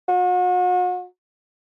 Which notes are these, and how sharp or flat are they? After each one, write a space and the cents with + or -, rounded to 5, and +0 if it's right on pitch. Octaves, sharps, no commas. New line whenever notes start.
F#4 -40